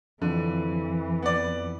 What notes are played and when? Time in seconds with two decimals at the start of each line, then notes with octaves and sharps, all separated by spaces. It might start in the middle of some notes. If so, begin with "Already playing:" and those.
0.22 F2 D3 E3
1.22 B3 D5